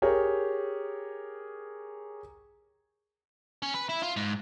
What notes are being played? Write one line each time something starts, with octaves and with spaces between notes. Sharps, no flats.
G4 G#4 A#4 C#5
C#4
B4
E4
F4
G#2